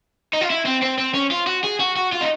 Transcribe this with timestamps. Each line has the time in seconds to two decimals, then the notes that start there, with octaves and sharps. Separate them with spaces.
0.33 D#4
0.41 F4
0.50 E4
0.65 C4
0.82 C4
0.98 C4
1.14 C#4
1.31 F4
1.47 F#4
1.64 G#4
1.80 F#4
1.96 F#4
2.12 F4
2.21 D#4